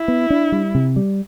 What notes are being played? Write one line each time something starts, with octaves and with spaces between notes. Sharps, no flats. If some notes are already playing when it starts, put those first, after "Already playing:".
Already playing: E4
B3
D4
G3
C3
G3